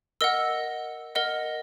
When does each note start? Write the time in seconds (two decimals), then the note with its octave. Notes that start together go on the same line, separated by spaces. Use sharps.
0.21 A#4 D#5 F#5 E6
1.15 A#4 D#5 F#5